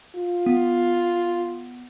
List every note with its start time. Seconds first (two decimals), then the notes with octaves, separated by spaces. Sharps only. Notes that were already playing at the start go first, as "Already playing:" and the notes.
0.16 F4
0.46 B3